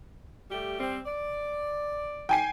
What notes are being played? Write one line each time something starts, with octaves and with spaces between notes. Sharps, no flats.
G3 A3 G4
G3 C4
D5
G5 G#5 C7